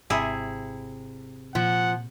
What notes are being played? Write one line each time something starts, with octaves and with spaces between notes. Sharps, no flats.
G#1 C3 E4 G#4
A#2 F3 F#5